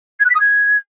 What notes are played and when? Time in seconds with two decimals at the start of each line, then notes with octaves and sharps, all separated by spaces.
0.19 G#6
0.24 F#6
0.30 B6
0.35 D#6
0.40 G#6